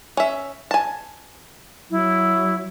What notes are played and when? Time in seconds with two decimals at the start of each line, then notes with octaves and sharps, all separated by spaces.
0.17 C#4 E5
0.71 G#5 A5
1.91 F#3 E4